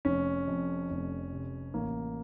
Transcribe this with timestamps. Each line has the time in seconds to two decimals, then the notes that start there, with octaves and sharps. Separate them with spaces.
0.05 F1 C#4
0.48 F2
0.90 F1
1.32 C3
1.74 A1 A#3